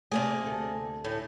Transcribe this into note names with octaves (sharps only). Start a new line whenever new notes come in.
C3 A3 A#3 G#4 D5
D2 A4
A2